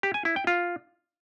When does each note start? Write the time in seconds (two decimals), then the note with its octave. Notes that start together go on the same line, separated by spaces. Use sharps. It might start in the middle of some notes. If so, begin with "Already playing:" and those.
0.03 G4
0.14 G#5
0.25 E4
0.36 G5
0.47 F4